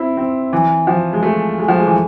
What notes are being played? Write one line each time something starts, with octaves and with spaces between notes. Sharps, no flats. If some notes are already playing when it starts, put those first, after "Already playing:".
Already playing: C4 E4
C4
E3
F3
G#3
A3
G#3
F3
G#3
E3